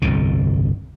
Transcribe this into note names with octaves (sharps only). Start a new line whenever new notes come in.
G1 C2 F2 B2